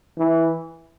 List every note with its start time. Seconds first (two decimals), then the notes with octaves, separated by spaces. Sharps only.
0.17 E3